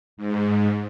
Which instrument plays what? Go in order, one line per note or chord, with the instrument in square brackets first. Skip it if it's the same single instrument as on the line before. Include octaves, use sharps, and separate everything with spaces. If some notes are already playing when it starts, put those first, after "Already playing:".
[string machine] G#2